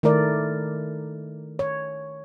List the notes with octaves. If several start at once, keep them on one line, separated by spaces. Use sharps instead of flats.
D#3 A3 E4 A#4 D5
C#5